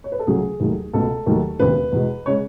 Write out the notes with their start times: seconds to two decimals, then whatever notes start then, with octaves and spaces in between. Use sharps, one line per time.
0.04 C#5
0.12 B4
0.19 A4
0.27 C#2 C#3 F#3 A3 G#4
0.60 D#2 D#3 F#3 A3
0.93 C#2 B2 A3 A4
1.26 D#2 D#3 F#3 A3
1.59 E1 D#2 C#3 B4
1.92 E2 B2 G#3
2.26 C#3 G#3 C#5